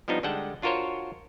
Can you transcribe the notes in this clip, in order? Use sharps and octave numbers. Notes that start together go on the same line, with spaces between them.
F3 G3 B3 D4 D#4
D3 G3 G#3 F#5 G5 A5
D4 F4 F#4 A#4 C5 C#5